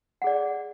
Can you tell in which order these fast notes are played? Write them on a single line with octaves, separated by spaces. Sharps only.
F#5 G#4 D5